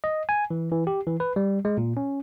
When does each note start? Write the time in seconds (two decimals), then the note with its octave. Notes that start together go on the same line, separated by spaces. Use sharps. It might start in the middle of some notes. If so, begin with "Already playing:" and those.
0.04 D#5
0.29 G#5
0.51 E3
0.72 E3
0.87 G4
1.07 E3
1.20 B4
1.36 G3
1.65 G#3
1.78 A#2
1.97 C#4